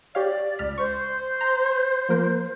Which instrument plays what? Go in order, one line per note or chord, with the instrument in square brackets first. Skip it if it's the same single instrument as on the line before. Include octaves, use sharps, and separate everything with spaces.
[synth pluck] G4 C#5 F5 [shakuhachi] D5
[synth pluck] C#2 F6 B6
[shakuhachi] C5 [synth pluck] C#6
[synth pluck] A#5
F3 A#3 A#4